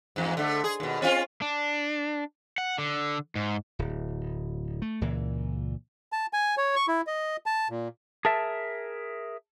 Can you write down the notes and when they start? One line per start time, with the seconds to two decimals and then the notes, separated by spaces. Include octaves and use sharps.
0.16 E2 G#2
0.37 D3 A3
0.64 G#4
0.80 D#2 B2
1.02 C4 C#4 F4
1.42 D4
2.58 F#5
2.78 D3
3.35 G#2
3.79 D1
4.82 A3
5.01 C#2 A#2 E3
6.12 A5
6.33 G#5
6.57 C#5
6.76 C#6
6.88 E4
7.07 D#5
7.46 A5
7.70 A#2
8.25 G#4 A#4 E5 A5